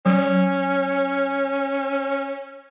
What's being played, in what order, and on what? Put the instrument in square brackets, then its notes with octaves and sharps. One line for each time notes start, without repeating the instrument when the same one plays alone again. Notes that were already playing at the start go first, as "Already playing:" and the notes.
[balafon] F#3 [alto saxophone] C#4